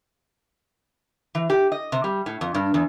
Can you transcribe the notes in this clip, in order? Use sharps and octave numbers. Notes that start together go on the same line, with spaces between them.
E3
G4
D#5
C3
G3
A2
F2
G2
E2